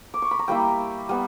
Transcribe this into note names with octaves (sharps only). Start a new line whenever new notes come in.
D6
C#6
B5
A#5
G3 A#3 E4 G5
G3 B3